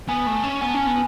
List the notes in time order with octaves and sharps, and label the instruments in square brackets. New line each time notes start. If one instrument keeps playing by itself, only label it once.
[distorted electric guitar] B3 [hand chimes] G#5
[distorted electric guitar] A3
C#4
[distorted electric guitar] B3 [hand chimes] G#5
[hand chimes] A5
[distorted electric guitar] C#4 [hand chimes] G#5
[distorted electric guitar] B3